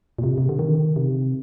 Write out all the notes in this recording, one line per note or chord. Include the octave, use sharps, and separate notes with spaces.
A#2
C3
C3
D3
D#3
C3